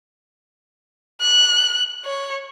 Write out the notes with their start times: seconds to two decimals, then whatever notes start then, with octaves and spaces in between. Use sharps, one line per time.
1.21 F#6
2.05 C#5